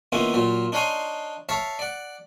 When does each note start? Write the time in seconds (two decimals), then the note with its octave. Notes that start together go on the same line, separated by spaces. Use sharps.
0.12 D#3 A#3 B3 C#4 E4 F4
0.34 A#2 F#3 F4
0.72 D4 D#4 C#5 F5 G#5 C6
1.49 C#5 E5 F5 A5 C#6
1.79 D5 F#5